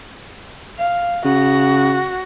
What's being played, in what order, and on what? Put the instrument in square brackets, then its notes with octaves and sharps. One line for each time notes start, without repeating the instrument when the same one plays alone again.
[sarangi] F5
[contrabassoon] C#3 [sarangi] F#4